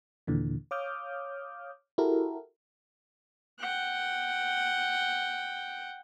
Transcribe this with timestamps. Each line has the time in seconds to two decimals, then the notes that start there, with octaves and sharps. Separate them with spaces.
0.27 D#2 A#2 D3 E3
0.71 C#5 F5 D6 D#6 F6 G6
1.98 E4 F#4 G4 A4 A#4
3.59 F#5 G5